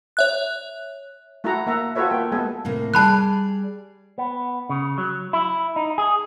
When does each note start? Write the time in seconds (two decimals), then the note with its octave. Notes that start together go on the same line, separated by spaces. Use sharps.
0.17 C#5 E5 F#6
1.44 A3 E4 F#4 A4 F#5 A#5
1.67 A#3 E5 F#5 A#5
1.95 F4 F#4 A4 B4 C#5 E5
2.10 A#3 G5
2.32 G#3 A#3 B3 A4 G#5
2.65 A2 C3 A#3
2.94 G3 G#4 D5 A5 B5 F#6
4.18 B3
4.70 C#3
4.98 F#3
5.33 E4
5.76 D#4
5.98 G#4